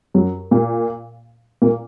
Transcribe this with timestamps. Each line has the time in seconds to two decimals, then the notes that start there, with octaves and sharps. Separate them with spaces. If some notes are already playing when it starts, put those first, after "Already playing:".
0.14 F#2 F#3
0.51 A#2 A#3
1.62 A#2 A#3